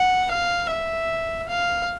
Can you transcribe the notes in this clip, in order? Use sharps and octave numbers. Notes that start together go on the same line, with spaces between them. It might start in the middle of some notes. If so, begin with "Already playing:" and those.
Already playing: F#5
F5
E5
F5